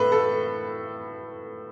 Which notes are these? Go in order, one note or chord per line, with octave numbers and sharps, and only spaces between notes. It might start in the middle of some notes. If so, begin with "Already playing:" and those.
Already playing: A2 A4 B4
A4